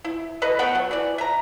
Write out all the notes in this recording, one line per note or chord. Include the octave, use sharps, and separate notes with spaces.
E4
A4 B4 D#5
A3 B3 F#5 G5
F#3
E3 D5
E5 A#5